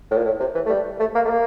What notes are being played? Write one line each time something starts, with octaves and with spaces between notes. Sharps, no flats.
A2
A#2
A2
C3
E3
A3
G3
A3
A#3
A3
A#3